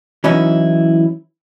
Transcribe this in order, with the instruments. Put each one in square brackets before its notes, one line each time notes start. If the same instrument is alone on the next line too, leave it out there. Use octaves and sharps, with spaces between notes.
[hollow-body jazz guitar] E3 F#3 C#4 D#4 E4